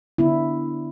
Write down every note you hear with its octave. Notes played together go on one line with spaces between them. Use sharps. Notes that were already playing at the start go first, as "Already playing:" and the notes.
D3 B3 D4 E4